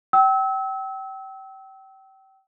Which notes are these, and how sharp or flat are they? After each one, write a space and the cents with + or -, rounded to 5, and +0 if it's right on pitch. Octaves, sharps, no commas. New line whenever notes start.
G5 -30 E6 -30